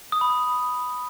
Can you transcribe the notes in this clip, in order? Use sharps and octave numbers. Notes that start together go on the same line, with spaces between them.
D#6
B5
D#6